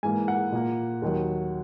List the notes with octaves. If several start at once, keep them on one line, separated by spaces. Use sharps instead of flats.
G#2 E3 A#3 G#5
F#5
A#2 A#3
D#2 D#3 F#3